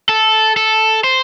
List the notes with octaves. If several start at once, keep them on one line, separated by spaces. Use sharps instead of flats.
A4
A4
C5